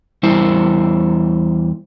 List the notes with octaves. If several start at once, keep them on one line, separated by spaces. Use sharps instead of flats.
E2 G3 E4 C5